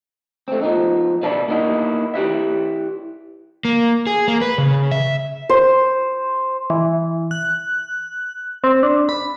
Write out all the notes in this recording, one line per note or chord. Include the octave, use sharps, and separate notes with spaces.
A3 C4
F3 B3 D#4
B2 B4 D5 E5 A5
A#3 B3 D#4 E4
E4 G4 B4 E5
A#3
G#4
A#3
B4
C#3
E5
C5
E3
F#6
C4
D4
B5